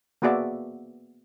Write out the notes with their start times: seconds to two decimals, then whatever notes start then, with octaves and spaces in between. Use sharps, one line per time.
0.22 A#3 B3 F#4 G#4 D5 E5